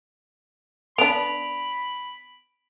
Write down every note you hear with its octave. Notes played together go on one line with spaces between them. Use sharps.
B3 D4 B5 D7 F7